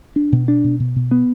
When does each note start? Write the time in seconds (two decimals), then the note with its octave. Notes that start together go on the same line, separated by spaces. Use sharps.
0.16 D4
0.32 B2
0.48 D4
0.64 B2
0.80 B2
0.96 B2
1.11 B3